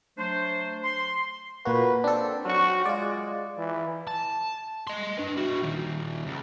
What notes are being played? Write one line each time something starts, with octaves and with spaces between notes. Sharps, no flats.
F#3 A3 D4 C5
C6
A#2 A#3 F#4 B4
C4 D4 A4
F#3 F#4 C#6
G#3 F4 D5
E3
A5
D#5 C6
D4 B4
E4 F#4
A#2 D#3
C#2